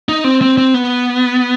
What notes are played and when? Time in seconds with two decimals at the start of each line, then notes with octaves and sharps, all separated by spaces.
0.09 D#4
0.24 C4
0.41 C4
0.58 C4
0.74 B3